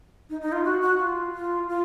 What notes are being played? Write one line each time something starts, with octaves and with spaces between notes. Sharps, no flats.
D#4
D#4
F4
F#4
F#4
F4
F4
F4